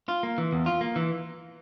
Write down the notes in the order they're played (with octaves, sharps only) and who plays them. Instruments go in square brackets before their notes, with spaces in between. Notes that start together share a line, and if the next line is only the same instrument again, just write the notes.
[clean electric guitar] F4
A#3
E3
E2
F4
A#3
E3